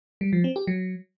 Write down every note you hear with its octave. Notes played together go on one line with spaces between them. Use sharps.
G3
F3
C4
G4
F#3